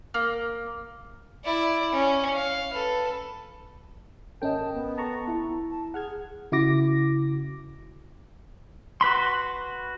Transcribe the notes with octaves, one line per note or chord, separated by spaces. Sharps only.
A#3
E4 D5
C#4
F5
A4 B4
G#1 C#4 A#4 D#5 G5 A5
B3
A4 A5 A#5 C#6
E4
A5
G#4 F#5 F6 G#6
C#3 E4 F#4 D6 A#6
F#4 B4 B5 C6